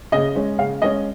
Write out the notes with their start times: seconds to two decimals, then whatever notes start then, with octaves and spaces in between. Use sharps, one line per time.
0.12 C#3 D#5
0.35 G#3 C#4
0.59 C#3 F5
0.82 G#3 C#4 D#5